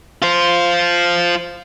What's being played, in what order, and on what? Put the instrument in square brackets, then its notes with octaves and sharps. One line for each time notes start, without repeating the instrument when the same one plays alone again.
[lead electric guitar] F4 C5